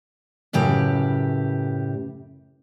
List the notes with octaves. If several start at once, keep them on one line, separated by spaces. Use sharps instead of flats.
F#2 A2 C#3 G4 B4